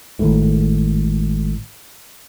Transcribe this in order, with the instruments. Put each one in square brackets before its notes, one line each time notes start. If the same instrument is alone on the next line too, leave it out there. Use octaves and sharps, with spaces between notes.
[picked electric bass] G#1 A2